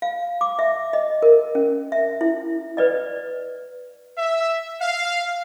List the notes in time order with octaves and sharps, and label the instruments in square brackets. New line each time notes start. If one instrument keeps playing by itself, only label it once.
[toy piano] F5
D6
E5
D#5
A#4
C#4
E5
E4
B4 D5 D#5
[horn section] E5
F5